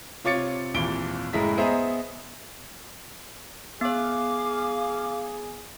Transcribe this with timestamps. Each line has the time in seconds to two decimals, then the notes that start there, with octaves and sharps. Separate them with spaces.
0.24 C3 F4 C#5 D6 A6 C#7
0.74 G#1 D#2 A#2 E3 D7 G7
1.33 F#1 A2 G#3 E4 A#5 B6
1.57 B3 G#4 C5 D#5 E5 A#5
3.81 B3 G#4 C#5 F5 D6